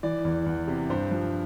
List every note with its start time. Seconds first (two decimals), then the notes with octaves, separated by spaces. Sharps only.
0.03 E3 D5
0.25 E2
0.46 E2
0.68 C3
0.90 G2 C5
1.11 F3